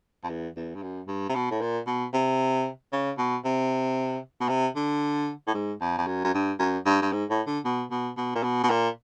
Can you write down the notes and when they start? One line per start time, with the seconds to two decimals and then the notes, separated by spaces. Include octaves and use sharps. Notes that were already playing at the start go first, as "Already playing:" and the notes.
0.24 F2
0.29 E2
0.56 E2
0.75 G2
0.83 F#2
1.08 G2
1.29 C3
1.35 B2
1.50 A2
1.61 A#2
1.87 B2
2.13 C3
2.92 C#3
3.18 B2
3.45 C3
4.40 B2
4.49 C3
4.76 D3
5.47 A2
5.54 G#2
5.81 F2
5.98 F2
6.07 F#2
6.24 F#2
6.34 G2
6.59 F#2
6.86 G2
7.02 G2
7.12 G#2
7.29 A2
7.47 D3
7.65 B2
7.91 B2
8.17 B2
8.35 A#2
8.43 B2
8.63 B2
8.70 A#2